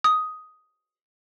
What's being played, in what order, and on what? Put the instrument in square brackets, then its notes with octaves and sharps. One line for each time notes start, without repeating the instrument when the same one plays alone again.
[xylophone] D#6